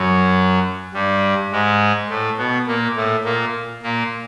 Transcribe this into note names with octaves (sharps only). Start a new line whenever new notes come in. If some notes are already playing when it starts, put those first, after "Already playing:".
Already playing: F#2 F#3
G2 G3
G#2 G#3
A2 A3
B2 B3
A#2 A#3
A2 A3
A#2 A#3
A#2 A#3